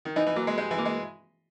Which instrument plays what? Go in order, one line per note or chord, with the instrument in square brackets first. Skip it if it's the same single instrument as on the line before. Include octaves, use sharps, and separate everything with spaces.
[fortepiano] D#3
[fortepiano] E3 [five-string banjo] D#4
[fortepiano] E3
[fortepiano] F#3 [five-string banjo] A#3
[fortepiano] G#3
[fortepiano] G#3 [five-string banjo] G4
[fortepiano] E3
[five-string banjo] A#3
[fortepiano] G#3